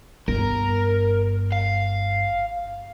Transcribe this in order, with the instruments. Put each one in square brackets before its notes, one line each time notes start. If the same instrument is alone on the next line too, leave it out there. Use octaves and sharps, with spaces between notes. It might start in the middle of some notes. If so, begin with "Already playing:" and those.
[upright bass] G1 [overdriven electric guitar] A#4
[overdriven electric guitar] F5